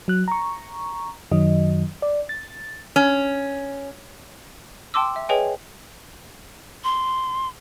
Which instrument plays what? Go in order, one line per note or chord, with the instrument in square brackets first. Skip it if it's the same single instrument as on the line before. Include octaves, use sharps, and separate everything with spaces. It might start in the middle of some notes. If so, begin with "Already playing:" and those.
[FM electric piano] F#3 F#6
A#5 C#6
F#2 D#3 F#3 D#5
D5
A6
[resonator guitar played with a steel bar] C#4
[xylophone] G5 A5 C6 D6 E6
E5
G#4 B4 C#5 D#5 G5 G#5
[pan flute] C6